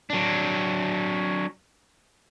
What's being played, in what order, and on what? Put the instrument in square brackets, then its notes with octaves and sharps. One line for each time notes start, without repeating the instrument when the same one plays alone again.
[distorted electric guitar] F#3 D4